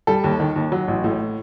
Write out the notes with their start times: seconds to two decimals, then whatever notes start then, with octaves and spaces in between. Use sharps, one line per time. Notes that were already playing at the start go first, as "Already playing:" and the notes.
0.07 G3 A4
0.24 D#2
0.40 D#3
0.56 D#2
0.72 F#3
0.88 A1
1.04 A2